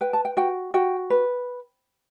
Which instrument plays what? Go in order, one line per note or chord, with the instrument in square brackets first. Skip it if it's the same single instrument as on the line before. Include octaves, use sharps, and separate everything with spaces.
[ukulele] B4 G5
A5
G5
F#4 G5
F#4 G5
B4